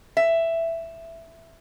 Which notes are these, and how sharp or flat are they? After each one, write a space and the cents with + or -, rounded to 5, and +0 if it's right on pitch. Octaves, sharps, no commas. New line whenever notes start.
E5 +5